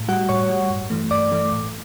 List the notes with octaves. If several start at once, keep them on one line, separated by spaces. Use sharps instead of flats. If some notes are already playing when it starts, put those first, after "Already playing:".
Already playing: A2
G3 F#4 F#5
A2 C#5 C#6
G3
G2
E3 A3
G2 D5 D6
E3 A3
A2